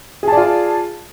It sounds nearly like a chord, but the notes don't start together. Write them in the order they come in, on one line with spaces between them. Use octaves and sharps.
G#4 A5 D5 F4